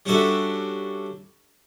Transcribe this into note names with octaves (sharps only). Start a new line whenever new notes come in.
G3 C#4 D4 F#4 A4 E5